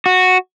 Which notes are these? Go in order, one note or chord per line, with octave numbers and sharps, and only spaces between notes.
F#4